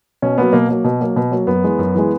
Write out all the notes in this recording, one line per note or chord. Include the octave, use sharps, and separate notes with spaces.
B2 C#4
F#3 A#3 B3
B2 A#3
F#3 A#3
B2
F#3 A#3
B2
F#3 A#3
F#2 B3
E3 G#3
F#2
E3 G#3